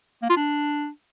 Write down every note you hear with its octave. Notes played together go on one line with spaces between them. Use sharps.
A#3
F4
D4